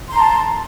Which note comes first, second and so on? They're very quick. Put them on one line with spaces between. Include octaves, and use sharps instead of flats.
C6 A#5 A5